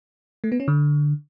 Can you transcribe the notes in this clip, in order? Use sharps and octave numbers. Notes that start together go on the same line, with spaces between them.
A3
B3
C#4
D3